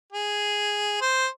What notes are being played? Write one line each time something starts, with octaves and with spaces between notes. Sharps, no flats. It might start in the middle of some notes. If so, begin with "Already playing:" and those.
G#4
C5